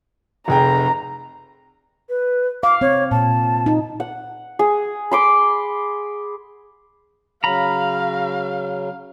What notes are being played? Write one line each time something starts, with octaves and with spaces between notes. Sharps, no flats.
F1 G#4 G5 A#5
B4
F5 D6
C4 C#5
A#2 A5
D#4
F#5
G#4
B5 C6 D6
C#3 F#3 F5 A#5 B5